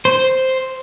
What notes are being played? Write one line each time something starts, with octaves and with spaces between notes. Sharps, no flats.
C5